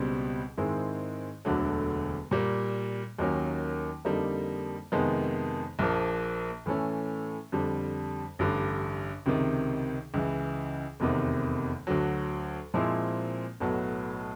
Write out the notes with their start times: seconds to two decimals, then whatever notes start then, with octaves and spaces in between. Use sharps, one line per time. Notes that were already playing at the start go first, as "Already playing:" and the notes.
Already playing: C#2 B2 G3 C4
0.57 G#2 D#3 G#3 C4 E4
1.45 E1 D2 D3 F#3 A3
2.31 A#2 G3 A#3
3.18 D#2 D#3 F#3 A#3 C#4
4.05 F2 D3 G3 A#3 D#4
4.92 F2 C3 D#3 G#3 B3
5.79 A#1 A#2 F3 A#3
6.66 A2 E3 A3 C#4
7.52 F2 D3 G3
8.39 A1 G2 D3
9.26 C#2 C3 D#3
10.14 C#2 C#3 E3
11.00 F1 E2 C3 D#3
11.87 D2 D3 F#3
12.74 A#2 F3 G#3 C4 E4
13.60 B1 A2 F#3 B3